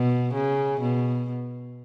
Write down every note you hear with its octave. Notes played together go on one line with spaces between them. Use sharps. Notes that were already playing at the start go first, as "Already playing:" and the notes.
Already playing: B2
C#3
B2